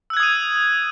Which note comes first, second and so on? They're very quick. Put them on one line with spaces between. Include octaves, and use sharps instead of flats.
E6 F#6 G#6 D#6 D#7